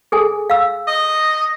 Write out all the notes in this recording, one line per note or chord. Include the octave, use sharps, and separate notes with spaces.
G#4 A4 G#5
F5 E6
D#5